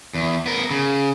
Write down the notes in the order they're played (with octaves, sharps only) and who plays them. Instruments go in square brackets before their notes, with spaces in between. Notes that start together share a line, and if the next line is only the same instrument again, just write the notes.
[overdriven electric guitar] E2
B3 A#4
C#3